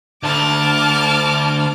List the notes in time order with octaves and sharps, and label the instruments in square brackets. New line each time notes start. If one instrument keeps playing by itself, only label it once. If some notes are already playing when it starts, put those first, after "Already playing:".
[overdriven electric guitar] D2 D3 [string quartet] A5 D6 F6